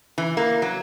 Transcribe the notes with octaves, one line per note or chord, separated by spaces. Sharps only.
E3
A#3
F#3